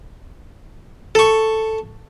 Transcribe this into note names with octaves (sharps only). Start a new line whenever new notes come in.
A4 C#6